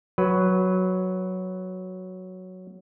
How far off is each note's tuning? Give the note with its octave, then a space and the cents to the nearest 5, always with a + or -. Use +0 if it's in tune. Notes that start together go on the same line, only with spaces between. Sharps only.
F#3 +0 B4 +0